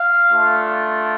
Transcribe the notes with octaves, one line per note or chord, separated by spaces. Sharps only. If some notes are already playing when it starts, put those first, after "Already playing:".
Already playing: F5
A3 D4 F4